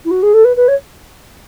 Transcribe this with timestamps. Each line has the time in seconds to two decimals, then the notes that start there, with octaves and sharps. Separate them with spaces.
0.05 E4
0.11 F#4
0.23 G#4
0.34 A4
0.44 B4
0.56 B4
0.68 C#5